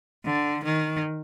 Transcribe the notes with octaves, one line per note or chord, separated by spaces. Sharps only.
D3
D#3